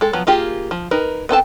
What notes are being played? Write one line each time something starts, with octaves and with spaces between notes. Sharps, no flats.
G#3 A4
F3 F#3 B3
A#3 F4 G4 G#4
F3
D#4 A#4 B4
B3 C4 A4 A5